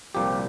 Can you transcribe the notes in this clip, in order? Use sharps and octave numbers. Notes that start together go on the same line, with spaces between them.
C2 A#2 F3 G4